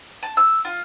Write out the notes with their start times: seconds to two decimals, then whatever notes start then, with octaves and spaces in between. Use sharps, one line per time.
0.23 A5
0.37 E6
0.65 F4